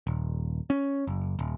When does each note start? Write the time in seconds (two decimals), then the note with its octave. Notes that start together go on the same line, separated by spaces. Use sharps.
0.07 D#1
0.70 C#4
1.07 F#1
1.39 D#1